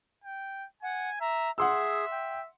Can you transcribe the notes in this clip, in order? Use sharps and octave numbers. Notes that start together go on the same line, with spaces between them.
G5
F#5 G#5
E5 A#5
G#4 E5 F#5 C6 E6
G5